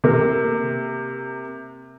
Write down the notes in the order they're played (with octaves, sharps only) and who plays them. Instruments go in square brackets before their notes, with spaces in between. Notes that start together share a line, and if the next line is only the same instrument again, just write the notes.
[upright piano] C3 A#3